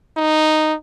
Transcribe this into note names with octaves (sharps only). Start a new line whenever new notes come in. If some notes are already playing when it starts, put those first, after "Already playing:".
D#4